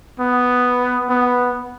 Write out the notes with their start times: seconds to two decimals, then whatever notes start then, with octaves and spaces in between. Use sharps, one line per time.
0.19 B3
1.09 B3